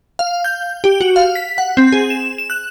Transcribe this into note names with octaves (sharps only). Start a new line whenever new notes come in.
F5
G6
G4
F#4
F5
B6
F#5
C4
G#4
E7
E7
F#6